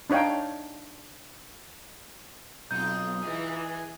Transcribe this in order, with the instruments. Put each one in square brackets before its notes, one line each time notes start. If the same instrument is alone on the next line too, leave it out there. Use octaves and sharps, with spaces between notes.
[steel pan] D4 D#4 C#5 F5 G5
[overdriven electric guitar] B1 [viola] C4 [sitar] D#4 F4 [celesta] G6
[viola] E3 D#5 [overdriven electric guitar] G#4